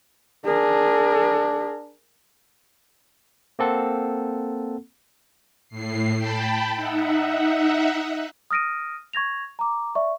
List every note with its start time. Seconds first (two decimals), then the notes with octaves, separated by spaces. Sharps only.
0.45 D4 G#4 A#4
3.59 A#3 C4 A4 F#5
5.69 A2 C7
6.17 G5 A5 B5
6.76 D#4 E5 F#5
8.51 D#6 F6 A#6 D7 D#7
9.13 C#6 G#6 A#6 F7
9.59 A#5 D6
9.95 D5 E5 C#6